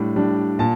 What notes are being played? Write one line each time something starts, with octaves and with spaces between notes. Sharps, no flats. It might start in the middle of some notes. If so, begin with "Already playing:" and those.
Already playing: A2 G3 D4
G3 D4
A#2 A5